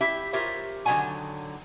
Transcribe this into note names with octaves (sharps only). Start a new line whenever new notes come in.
E4 G4 E5
F4 G4 A#4 C5 C#5 E5
D3 D#3 F#3 C#5 F#5 G#5